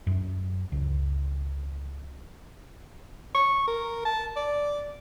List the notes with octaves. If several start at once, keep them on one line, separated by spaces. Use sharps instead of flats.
F#2
C#2
C#6
A#4
A5
D5